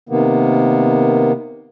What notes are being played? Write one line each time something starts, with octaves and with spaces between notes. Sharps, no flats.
C3 D#3 A#3 B3